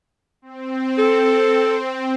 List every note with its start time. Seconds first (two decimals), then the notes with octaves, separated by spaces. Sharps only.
0.42 C4
0.98 A4